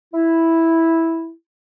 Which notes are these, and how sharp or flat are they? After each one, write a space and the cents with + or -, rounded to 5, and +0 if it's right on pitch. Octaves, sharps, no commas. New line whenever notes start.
E4 -5